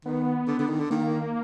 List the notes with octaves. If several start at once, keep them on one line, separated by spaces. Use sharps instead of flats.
D#3 B3
D3
D3
D#3
D3
D#3 A#3